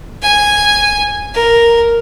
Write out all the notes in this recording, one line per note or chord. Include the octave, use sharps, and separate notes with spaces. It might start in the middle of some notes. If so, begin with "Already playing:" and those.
G#5
A#4